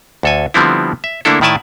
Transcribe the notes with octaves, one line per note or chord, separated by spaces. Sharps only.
D2 A4 G#5
D3 F3 G3 B3 C4 E4
E5
D3 A3 A#3 D4 E4 A4
A2 D#3 E4 D5 G#5 A5